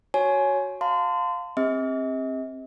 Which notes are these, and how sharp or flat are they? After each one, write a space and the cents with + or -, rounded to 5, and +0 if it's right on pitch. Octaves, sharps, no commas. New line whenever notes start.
F#4 +0 C#5 +0 G#5 +20
F5 +15 A5 +35 C6 -30
C4 +25 G#4 -45 D#5 +45